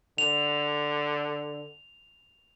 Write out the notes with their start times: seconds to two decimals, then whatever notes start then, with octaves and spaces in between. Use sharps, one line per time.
0.18 D3 F7